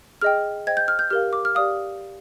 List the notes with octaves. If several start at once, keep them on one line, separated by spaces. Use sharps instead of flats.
G#4 D#5 G5 F6
C5 D#5 G5 G#6
G6
F6
G6
G4 A#4 F5 F6
D6
F6
G4 D5 F5 D#6